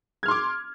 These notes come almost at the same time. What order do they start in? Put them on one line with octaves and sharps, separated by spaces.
G#6 F6 C6 D6